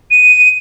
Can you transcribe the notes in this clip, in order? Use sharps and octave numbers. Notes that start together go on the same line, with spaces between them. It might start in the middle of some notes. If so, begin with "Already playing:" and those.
D#7